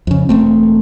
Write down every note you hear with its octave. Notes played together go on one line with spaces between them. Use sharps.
F2 C#3
E1 A3 C4